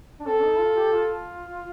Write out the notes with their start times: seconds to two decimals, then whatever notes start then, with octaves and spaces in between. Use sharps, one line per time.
0.19 D4
0.26 C4 A4
0.43 D#4
0.59 F4
0.76 G4
0.92 F4